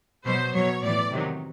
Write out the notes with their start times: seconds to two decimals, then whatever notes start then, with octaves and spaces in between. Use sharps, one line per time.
0.25 B2 F#3 C5
0.53 B2 F#3 C#5
0.82 A2 E3 D5
1.12 C3 D#3 F#3